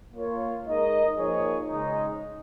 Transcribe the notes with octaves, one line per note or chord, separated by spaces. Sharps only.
A#3 F4 C#5
G#3 D#4 A#4 D#5
F3 A#3 D#4 G#4 C#5
C#3 G#3 D#4